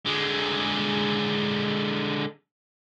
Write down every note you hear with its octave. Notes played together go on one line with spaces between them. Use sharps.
D3 G#3